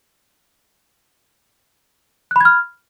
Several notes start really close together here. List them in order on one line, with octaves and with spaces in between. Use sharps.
F#6 B5 G#6 F6